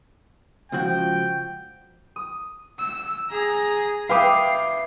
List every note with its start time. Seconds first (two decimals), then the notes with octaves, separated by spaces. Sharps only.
0.72 C#2 F3 F#4 G5
2.16 D#6
2.79 E6
3.31 G#4 A#5
4.10 B4 E5 F5 G5 D6 D#6 C7